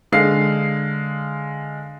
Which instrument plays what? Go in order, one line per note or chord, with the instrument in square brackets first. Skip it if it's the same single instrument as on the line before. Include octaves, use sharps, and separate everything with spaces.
[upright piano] D3 G#3 F5 C7